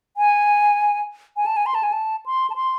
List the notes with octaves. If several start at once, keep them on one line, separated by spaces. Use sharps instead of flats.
G#5
G#5
A5
G#5
C6
A5
G#5
A5
C6
A5
C6